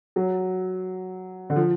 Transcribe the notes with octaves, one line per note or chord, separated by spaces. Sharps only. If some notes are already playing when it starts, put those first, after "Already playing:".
F#3
D3
F3